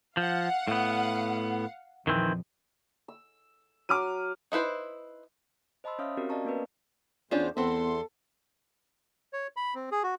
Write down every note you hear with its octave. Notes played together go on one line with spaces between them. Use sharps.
F3 F5 F#5
A2 B3
A#1 F2 D#3 E3 C4
E6
F#3 D6 F6 D#7
D#4 E4 B4 C5
C5 D#5 A5 B5 C6 E6
C#4 C#5 E5 F5 D#6 F6
C4 C#4 F#4 G4 A#4
D5 D#5 F5 A5 A#5 C#6
A#3 B3 C#4 A#4 B4
E2 C#3 C#4 D4 F4 C5
E2 B3 C4 E4 A4 F#5 C6
C#5
B5
C4
G#4
F#4